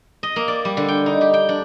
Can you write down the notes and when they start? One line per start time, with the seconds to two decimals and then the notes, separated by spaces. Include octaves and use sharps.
0.23 D#5
0.36 A#3
0.48 D5
0.65 G3
0.77 D3
0.88 G5
1.06 D#4
1.21 G4
1.34 G5
1.49 D4